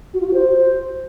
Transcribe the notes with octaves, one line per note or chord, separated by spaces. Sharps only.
F#4
F4
F#4
C5